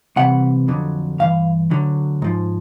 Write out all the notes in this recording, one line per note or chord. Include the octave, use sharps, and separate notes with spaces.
C2 C3 E3 F#5
F2 D3 F#3
G2 E3 F5
D2 D3 F#3
G#2 F3